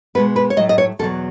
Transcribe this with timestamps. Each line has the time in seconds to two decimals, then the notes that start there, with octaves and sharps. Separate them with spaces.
0.15 B2 G#3 B3 B4
0.36 B4
0.50 C#5
0.57 A2 F#3 A3 D#5
0.69 D#5
0.78 C#5
0.99 E2 B2 F#3 A4